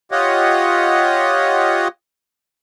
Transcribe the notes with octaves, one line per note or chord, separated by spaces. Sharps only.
F4 G4 C#5 D#5 F#5